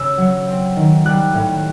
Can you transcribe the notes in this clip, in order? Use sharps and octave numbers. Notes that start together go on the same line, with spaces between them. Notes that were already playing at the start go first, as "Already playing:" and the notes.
Already playing: C#3 E6
F#3
C4
D#3
G3 F#6
A2